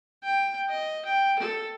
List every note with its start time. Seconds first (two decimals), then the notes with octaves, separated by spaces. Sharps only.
0.24 G5
0.69 D#5
1.05 G5
1.39 A4